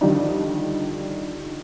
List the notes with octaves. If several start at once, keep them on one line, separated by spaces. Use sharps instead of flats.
D3 D#3 F3 G3 D4 D#4